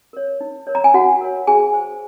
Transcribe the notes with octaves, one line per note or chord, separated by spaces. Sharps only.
A#4 C#5
D#4
A#4 C#5
A#5
G#5
D#4 F#4 F#5
A#4 C#5
F#4 G#4 G#5
C5